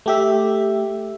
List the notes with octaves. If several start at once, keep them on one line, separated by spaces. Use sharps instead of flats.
A3 G4 E5